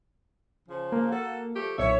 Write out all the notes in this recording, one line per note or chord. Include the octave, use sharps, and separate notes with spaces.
C#3 F3
A#3
F#4 A4
F3 A3 G4
B1 E2 A#2 C#5 E5